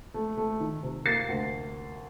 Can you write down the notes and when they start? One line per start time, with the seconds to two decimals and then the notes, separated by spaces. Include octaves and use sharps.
0.14 A3
0.37 A3
0.60 D#3
0.83 C3
1.06 A#3 A6 C7
1.29 D2